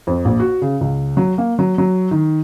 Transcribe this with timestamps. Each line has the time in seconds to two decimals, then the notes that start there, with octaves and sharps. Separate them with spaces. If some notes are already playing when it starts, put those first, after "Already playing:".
0.07 F2
0.25 A#1
0.40 F#4
0.62 C#3
0.81 C#2
1.17 F#3
1.38 A#3
1.59 F#3
1.78 F#3
2.11 D#3